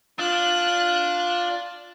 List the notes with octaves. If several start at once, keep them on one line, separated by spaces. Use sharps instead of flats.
D4 F4 F#6